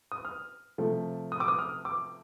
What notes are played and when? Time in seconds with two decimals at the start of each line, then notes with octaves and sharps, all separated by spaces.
0.12 D#6
0.25 F6
0.78 C3 F3 A3
1.32 D#6
1.40 D6
1.48 D#6
1.59 F6
1.85 D6